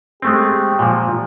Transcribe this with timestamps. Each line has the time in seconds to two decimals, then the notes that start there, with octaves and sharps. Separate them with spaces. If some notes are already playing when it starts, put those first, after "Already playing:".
0.22 G#3 A3 C4 G4
0.79 A#2 F3